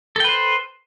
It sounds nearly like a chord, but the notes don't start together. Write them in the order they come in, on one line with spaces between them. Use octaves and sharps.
A4 G5 B4 C5